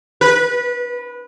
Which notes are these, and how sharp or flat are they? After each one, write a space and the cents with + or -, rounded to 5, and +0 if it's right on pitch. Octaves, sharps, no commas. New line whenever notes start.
B4 -25